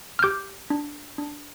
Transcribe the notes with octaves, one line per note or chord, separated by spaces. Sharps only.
F6
G4 D6 G6
D4
D4